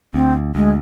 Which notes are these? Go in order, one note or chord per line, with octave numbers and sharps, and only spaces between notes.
D2 C4
D2 G#3